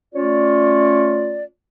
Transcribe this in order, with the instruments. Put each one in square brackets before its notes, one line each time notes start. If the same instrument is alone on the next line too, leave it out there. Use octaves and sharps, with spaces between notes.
[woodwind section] A3 C#4 F4 C#5 D5